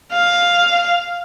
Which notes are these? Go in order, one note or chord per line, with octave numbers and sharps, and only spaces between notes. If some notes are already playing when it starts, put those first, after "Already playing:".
F5